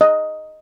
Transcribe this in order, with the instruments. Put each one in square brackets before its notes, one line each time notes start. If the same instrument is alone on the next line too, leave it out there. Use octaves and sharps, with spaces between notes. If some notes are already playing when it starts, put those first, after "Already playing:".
[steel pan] D#5